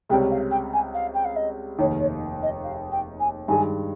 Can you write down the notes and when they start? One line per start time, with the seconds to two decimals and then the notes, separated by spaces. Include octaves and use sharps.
0.10 C#2 C3 G3 C#4 G5
0.31 F5
0.51 G5
0.73 G#5
0.94 F5
1.14 G5
1.25 F5
1.36 D#5
1.78 F1 D#2 D#3 C#5
2.00 C#5
2.43 D#5
2.64 F5
2.91 G5
3.20 G#5
3.48 G2 D#3 G#3 G#5